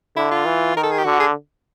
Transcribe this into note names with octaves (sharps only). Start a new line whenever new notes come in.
D3 E4
F4
E3
D#3 A#4
A4
G#4
G4
D3 F#4
G#4